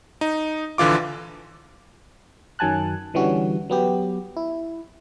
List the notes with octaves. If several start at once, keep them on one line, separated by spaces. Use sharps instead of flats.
D#4
A#1 D3 E3 F4 D6
F#2 D#3 F#3 G#5 A5 F#6
D3 E3 G3 C#4 F#4
F#3 B3 G4
E4